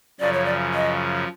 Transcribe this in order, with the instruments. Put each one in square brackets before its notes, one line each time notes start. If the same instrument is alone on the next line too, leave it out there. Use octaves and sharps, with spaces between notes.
[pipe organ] F#2 C#3 F3 [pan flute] D5
[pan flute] C#5
D5
D#5